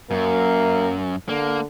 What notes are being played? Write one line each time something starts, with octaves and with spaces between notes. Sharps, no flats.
F#2 A#3
D3 A#3